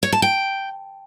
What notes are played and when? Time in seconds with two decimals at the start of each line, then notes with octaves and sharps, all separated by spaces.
0.03 C#5
0.12 A5
0.22 G5